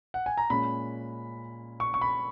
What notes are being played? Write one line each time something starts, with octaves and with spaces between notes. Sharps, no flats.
F#5
G#5
A#5
A#2 G#3 C#4 B5
C#6
C#6
B5